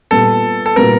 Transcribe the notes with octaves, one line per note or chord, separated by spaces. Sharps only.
A#2 G3 B3 A4
A4
A#2 G3 B3 A#4